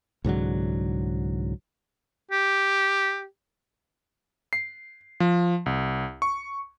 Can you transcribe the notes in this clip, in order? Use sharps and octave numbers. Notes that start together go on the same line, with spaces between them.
C2 G#2 D3 F#3
G4
C7
F3
C2
C#6